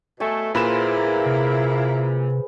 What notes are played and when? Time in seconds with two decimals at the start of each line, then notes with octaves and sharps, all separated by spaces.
0.20 B2 A3 G#5
0.55 A#2 A#3 E4 G#4 B4 C5 E7
1.26 C3